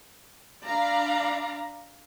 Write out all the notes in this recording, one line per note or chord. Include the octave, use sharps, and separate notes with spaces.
D4 D5 F5 A#5 B5